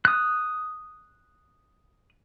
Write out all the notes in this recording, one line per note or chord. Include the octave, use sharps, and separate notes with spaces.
D#6 F#6